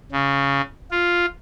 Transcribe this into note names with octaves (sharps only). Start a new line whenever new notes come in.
C#3
F4